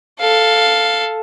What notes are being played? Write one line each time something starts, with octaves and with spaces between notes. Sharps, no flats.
A4 F5